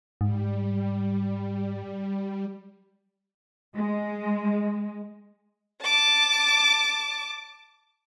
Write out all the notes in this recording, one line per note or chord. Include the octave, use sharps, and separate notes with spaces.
G#2 G3
G#3
A5 D6